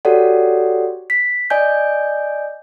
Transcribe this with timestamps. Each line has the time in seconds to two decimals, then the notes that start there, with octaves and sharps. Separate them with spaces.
0.05 F#4 G4 A4 C#5 D5 F#5
1.10 B6
1.50 D5 D#5 G#5 G6